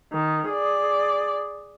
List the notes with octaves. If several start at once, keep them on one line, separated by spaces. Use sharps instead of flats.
D#3
G#4 D5